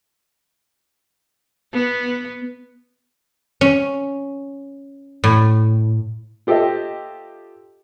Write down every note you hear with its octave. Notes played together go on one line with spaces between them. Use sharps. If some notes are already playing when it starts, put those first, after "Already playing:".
B3
C#4
A2
F4 G4 A4 C5 D#5 E5